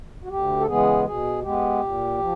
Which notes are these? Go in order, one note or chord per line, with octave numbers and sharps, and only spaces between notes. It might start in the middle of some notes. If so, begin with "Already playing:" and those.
F#4
D2 G4
A4
C#3 E3 G#3 B3 G#4
B2 G#4
G#3 B3 G4
A#2
F3